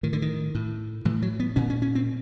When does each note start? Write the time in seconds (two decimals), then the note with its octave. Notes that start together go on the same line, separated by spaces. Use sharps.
0.03 A2 D#3
0.13 D3
0.22 D#3
0.55 A2
1.05 A2 E3
1.22 F#3
1.40 B3
1.56 A#2 C#4
1.70 C#4
1.82 C#4
1.95 C4